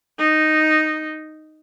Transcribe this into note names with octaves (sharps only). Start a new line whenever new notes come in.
D#4